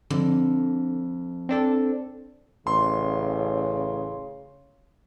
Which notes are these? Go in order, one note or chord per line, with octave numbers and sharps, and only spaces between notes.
F2 D3
C4 D4 A4
A1 C#3 C6